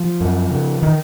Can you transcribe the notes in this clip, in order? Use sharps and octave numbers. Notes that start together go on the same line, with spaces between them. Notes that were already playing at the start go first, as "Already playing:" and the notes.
Already playing: F3
F#2
C#3
D#3